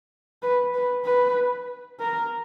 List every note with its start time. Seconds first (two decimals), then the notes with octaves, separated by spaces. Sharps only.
0.42 B4
0.74 B4
1.05 B4
1.99 A#4